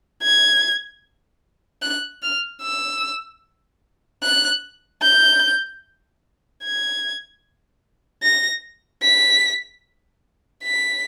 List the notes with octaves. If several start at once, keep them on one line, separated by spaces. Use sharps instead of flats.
G#6
F#6
F6
E6
F#6
G6
G#6
A#6
B6
B6